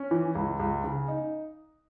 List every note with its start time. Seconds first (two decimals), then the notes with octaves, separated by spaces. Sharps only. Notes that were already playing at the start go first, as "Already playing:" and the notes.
Already playing: C#4
0.11 E3
0.35 C#2
0.59 C#2
0.84 C#3
1.08 D#4